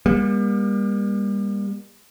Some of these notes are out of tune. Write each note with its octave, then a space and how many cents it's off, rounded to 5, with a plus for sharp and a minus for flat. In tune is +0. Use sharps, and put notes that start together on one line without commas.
G3 +35 A#3 +40